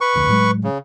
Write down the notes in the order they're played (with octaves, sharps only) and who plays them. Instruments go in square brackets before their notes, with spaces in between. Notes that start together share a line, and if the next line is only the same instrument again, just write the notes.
[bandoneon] B4 C#6
[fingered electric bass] F1 D2 D3
A2 F#3 G#3
[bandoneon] C#3